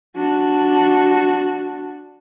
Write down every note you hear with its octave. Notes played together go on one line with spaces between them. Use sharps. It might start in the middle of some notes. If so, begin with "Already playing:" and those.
D4 F#4